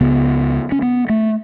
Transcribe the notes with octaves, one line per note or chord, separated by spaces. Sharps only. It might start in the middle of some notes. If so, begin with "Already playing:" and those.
C#2 C#3 B3
C#4
B3
A3